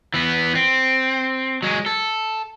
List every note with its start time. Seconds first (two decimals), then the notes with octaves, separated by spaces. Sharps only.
0.14 E3 B3
0.55 C4
1.62 F#3 G#3
1.86 A4